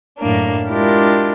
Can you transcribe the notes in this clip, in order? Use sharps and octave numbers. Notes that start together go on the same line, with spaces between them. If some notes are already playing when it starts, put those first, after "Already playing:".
F#2 A2 A#3 D4
G#3 D4 E4 F4 G4 A#4